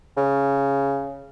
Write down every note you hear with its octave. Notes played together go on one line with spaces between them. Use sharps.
C#3